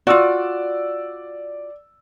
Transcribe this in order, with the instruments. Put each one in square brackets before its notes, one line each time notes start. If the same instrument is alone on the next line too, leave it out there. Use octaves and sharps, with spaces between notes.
[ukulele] F4 F#4 [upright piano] D5 E6